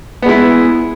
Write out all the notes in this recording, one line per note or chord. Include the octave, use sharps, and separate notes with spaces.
G#3 B3 E4